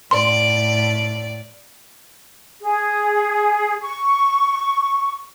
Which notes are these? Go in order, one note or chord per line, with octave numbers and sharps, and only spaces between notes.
A2 D5 C6
G#4
C#6